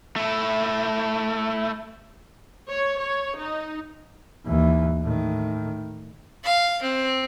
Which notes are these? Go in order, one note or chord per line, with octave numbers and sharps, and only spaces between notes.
A3 E4
C#5
C#5
D#4
D#2 E3
A2 D#3
F5
C4